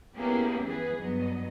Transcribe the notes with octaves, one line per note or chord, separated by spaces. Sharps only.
A#3 B3 C#4 E4 G4 G#4
E3 B3 G#4 B4
G2 F#3 B3 D#5